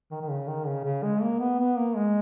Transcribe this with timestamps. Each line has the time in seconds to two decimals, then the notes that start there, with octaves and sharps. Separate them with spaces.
0.12 D#3
0.22 D#3
0.30 C#3
0.48 D#3
0.67 C#3
0.85 C#3
1.03 G#3
1.22 A#3
1.40 B3
1.59 B3
1.77 A#3
1.96 G#3